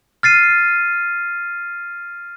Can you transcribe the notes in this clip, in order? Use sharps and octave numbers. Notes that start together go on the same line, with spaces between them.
F6 A6 C7 D#7